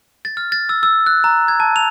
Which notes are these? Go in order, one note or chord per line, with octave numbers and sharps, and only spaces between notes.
A6
F6
A6
E6
E6
F#6
A#5
G#6
A5
F7